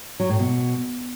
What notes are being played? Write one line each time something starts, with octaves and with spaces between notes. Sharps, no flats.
F#3
A2
B2